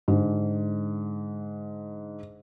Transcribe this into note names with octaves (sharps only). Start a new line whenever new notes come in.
G#2 D3